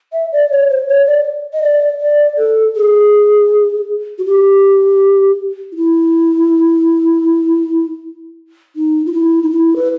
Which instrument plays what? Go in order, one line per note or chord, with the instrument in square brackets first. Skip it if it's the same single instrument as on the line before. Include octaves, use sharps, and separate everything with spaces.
[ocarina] E5
D5
C#5
C5
C#5
D5
D#5
D5
D5
A4
G#4
F#4
G4
F4
E4
D#4
F4
E4
D#4
E4
B4